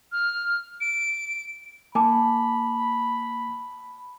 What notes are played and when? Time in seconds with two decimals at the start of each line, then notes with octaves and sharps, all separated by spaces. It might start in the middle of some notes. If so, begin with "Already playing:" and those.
0.12 F6
0.81 D7
1.95 A#3 G#5 A5 B5 D6